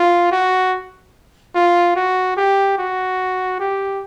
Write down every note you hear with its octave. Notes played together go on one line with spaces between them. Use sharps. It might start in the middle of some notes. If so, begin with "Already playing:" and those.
Already playing: F4
F#4
F4
F#4
G4
F#4
G4